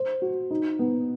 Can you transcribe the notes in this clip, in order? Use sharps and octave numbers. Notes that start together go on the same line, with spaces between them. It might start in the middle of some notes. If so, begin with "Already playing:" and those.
Already playing: C5
F#4
D#4
B3